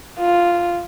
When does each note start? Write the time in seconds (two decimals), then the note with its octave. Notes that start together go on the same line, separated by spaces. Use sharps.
0.19 F4